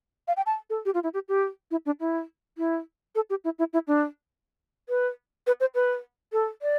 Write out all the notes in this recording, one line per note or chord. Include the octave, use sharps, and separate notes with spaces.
F5
G5
A5
A4
G4
F4
E4
G4
G4
E4
D4
E4
E4
A4
G4
E4
E4
E4
D4
B4
B4
C5
B4
A4
D5